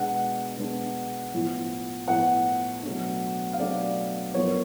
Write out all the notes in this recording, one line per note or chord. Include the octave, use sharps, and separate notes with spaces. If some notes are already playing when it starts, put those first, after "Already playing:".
Already playing: B2 G#3 B3 D4 F#5
B2 G#3 B3 D4
A2 F3 B3
A2 F3 B3 F#5
B2 F#3 A3 D4
F5
B2 F#3 A3 D4 D5
F#2 F3 B3 C#5